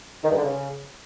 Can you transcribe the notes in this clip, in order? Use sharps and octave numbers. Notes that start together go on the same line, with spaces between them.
D#3
G2
D3
C#3